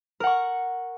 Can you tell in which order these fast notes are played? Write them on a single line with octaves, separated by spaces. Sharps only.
A#4 F#5 C#6